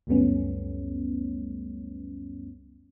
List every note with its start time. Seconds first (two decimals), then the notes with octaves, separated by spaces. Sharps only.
0.07 C#2 F#2 G3 A3 B3 C#4